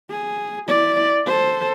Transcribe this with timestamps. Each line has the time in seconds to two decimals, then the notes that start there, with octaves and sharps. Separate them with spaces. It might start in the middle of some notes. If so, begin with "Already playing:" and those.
0.11 G#4
0.68 E4 D5
1.27 A4 C5